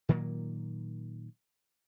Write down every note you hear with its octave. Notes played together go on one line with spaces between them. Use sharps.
A#2 D#3 F#3 A#3